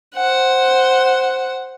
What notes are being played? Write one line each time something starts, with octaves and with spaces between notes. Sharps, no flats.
C5 F#5